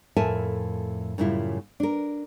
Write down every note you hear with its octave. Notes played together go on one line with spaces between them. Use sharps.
F2 A2 A#4 E5 G#5 A5
F#2 A2 C#3 G3 E4 F4
D4 A#4